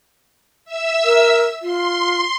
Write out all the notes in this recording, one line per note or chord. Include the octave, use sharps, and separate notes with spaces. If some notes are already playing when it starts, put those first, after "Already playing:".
E5 E6
A#4
F4 C6